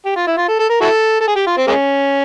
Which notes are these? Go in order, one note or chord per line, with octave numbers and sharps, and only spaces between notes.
G4
F4
E4
F4
A4
A4
A#4
E4 F#4 A4
A4
G#4
G4
F4
C4
G#3 A#3 C#4